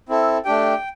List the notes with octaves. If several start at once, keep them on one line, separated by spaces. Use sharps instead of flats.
C4 E4 A4
A3 D4 G4 G5